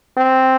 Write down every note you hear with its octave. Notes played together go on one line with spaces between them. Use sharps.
C4